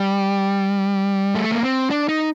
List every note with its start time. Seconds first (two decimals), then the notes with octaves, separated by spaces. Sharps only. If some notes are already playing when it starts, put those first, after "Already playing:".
Already playing: G3
1.35 A3
1.52 A#3
1.63 C4
1.90 D4
2.09 D#4